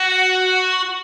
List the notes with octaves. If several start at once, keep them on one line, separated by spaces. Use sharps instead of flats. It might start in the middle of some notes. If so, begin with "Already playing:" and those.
Already playing: F#4